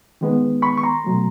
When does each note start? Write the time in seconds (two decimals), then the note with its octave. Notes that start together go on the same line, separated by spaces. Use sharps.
0.21 D#3 G#3 B3
0.62 B5 C#6
0.78 C#6
0.83 A#5 C6
1.04 B2 F#3 A3